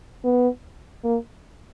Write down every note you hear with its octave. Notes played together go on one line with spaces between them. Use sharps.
B3
A#3